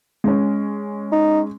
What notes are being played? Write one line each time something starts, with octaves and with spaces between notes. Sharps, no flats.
G#3 C#4
D#4